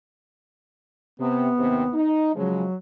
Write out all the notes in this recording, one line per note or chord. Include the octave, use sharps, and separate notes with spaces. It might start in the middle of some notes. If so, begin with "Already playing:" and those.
C3 B3
D#2 C3
D#4
C#3 F3 F#3 G#3